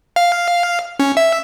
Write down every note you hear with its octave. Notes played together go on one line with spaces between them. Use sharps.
F5
C#4
E5